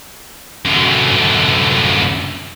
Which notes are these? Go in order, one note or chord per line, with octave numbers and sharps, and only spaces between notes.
F#2 D3